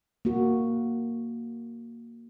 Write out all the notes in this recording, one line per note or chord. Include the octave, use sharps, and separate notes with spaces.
A#3 F#4